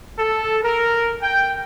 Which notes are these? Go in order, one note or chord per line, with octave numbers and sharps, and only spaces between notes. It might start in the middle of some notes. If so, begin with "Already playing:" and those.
A4
A#4
G5